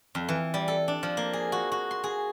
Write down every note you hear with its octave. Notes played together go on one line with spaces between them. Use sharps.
F2
E3
G3
A4
D4
F3
A#3
G#4
F#4
F#4
C6
G#4